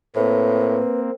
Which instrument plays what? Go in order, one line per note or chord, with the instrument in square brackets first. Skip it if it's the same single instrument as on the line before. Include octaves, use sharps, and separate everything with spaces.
[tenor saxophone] A2 [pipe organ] A#3 C4 [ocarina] B4